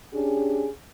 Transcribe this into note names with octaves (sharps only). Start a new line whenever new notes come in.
C#4 D4 G4 G#4